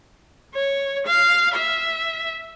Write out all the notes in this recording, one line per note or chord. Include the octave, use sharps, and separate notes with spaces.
C#5
F5
E5